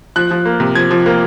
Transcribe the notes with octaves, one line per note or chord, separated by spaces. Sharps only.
F3 F#6
F3
A#3
C3
F3 G#6
F3
A#3